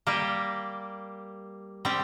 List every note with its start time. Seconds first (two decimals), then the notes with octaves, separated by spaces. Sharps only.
0.07 G3 A#3 G4
1.85 G3 C4 G4